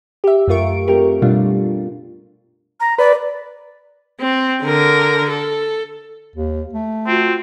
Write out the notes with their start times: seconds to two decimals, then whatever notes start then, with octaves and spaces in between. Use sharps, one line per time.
0.24 G4 E5
0.48 F#2 A3 F4 A#4 C#6 D7
0.88 A3 C4 G4 A#4
1.22 B2 G3 A3 D4 F4
2.80 A#5
2.99 B4 D5
4.20 C4
4.63 D3 A#4
5.30 A4
6.36 D#2
6.73 A3
7.06 C4 F4 F#4